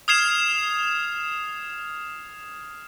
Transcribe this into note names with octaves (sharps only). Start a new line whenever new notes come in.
D#6 F6 G#6 C7 E7 F7